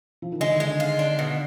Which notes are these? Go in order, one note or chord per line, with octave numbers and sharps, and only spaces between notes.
F3
D#3
D3 G#3
D#3
G#3
D#3
F4
D4
B2